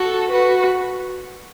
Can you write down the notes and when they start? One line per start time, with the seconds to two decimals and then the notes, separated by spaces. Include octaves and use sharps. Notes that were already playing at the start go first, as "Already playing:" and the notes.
Already playing: F#4 A4
0.31 F#4 B4